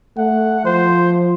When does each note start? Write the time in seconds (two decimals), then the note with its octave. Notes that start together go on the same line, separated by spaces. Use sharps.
0.18 A3 F#5
0.66 F3 C5